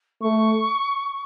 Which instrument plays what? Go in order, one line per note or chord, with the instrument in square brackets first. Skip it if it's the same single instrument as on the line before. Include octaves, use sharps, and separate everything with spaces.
[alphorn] A3 [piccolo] C#6